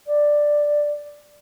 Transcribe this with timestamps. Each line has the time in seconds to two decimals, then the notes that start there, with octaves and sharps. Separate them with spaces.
0.07 D5